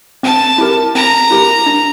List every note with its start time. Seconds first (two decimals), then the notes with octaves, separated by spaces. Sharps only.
0.23 C4 A5
0.58 E4 G4 A#4
0.95 C4 A#5
1.31 E4 G4 A#4
1.66 D4